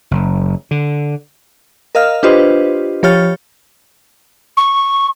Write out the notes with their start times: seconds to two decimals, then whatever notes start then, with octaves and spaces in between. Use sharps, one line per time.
0.11 F#1
0.71 D3
1.95 A#4 D#5 F5 F6
2.23 D4 F4 G4 B4 C5 D#5
3.03 F3 G4 C#5 F6 A6
4.57 C#6